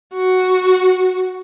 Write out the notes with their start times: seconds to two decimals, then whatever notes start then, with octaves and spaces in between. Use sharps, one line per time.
0.14 F#4